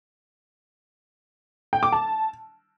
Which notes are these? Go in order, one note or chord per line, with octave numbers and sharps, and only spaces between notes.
G5
D6
A5